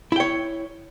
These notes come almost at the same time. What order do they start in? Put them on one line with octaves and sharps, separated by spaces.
E4 G5 C#5